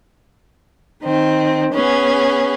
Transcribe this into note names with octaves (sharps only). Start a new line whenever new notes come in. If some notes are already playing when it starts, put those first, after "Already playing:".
D#3 C4
B3 C#4 G#4